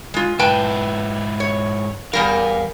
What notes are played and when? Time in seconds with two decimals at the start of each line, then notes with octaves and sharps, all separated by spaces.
0.14 G#3 F4
0.39 G#2 E4 B4 G5 A5
1.40 C#5
2.13 E2 G3 A#4 D5 F5